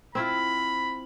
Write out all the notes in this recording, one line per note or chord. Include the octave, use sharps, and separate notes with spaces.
C4 E4 F4 B5